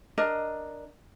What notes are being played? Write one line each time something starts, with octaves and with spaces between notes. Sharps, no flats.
D4 A#4 D#5